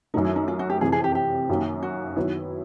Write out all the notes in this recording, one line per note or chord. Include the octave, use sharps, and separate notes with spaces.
F#2 D#3 F#3 A3 D#4
E4
D#4
F4
F#4
G4
F2 C3 E3 G#4
G#4
G4
G4
F#2 D#3 F#3 A#3
F#4
D#3 F#3 B3 E4